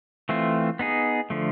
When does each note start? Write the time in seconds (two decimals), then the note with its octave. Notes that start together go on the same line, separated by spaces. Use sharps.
0.29 E3 A3 C4 F4
0.79 B3 D#4 G#4
1.30 D3 F3 A3